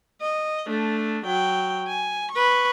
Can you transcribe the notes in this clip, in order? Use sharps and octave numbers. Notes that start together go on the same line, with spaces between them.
D#5
A3 D4
F#3 G5
G#5
B4 C#6